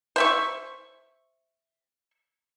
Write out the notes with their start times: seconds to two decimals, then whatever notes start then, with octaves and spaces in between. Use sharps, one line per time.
0.16 C5 E5 C#6